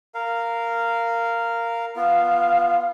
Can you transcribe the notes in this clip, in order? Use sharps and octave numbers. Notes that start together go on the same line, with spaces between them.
A#4 F5
B3 F4 F5